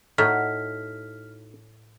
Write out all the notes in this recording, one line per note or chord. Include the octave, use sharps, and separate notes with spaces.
A2 D#4 F#4 F#5 F6 B6